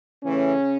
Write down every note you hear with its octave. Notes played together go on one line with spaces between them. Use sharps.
A2 C#3 E3 A3 C#4